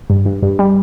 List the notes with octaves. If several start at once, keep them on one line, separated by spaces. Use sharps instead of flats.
G2
G2
G2
G3